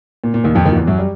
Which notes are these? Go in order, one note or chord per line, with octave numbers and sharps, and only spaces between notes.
A#2
A#2
D#2 D#3
F2 F3
D#2 D#3
F3
E2 E3
F#2 F#3
G3